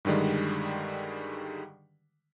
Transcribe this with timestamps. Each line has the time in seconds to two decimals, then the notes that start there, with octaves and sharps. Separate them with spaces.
0.05 G2 D3 D#3 G3 G#3